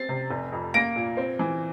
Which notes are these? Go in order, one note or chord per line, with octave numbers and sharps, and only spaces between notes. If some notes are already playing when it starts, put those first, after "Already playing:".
Already playing: C4 A6 C7
C3
F1
F2
A#3 A#6 D7
A#2
C4
E3